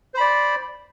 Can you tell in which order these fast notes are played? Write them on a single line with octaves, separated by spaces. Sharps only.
C5 B5 D5